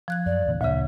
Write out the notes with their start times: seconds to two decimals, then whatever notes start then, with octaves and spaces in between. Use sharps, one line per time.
0.08 F3 F#6 G#6
0.26 F#2 D5
0.46 E2 A#2 D3
0.61 D2 A#2 C#3 E5